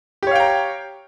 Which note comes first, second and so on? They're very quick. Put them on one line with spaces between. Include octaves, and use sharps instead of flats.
G4 C#5 F5 G5 A#5